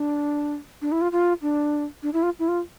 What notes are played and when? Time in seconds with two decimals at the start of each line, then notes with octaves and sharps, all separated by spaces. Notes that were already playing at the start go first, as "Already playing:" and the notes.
Already playing: D4
0.82 D4
0.92 E4
1.01 F4
1.12 F4
1.42 D4
2.03 D4
2.13 E4
2.23 F4
2.39 E4
2.48 F4